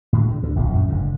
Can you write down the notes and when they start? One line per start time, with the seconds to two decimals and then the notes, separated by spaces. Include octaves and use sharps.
0.13 A2 D3 G#3
0.28 A2 D3
0.43 D2 D3
0.56 D1 A#1 A#2 F3
0.74 F#2 A#2
0.88 F#1 G#2 D3